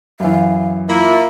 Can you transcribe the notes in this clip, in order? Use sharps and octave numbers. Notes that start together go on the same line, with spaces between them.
F#2 E3 F5
A#3 E4 F4